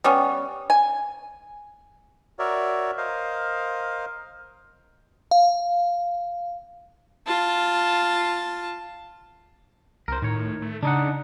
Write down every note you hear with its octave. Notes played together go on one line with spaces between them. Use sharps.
G3 B3 C#4
G#5
F#4 A#4 C#5 D5 E5
A#4 C5 D#5 F5
F5
F4 A5
C2 A#4 C5
A2 D#3 C#5
A3
C#3 D4 D#4 F#5